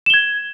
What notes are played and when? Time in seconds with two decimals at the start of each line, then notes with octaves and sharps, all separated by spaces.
0.06 E7
0.10 G7
0.14 G#6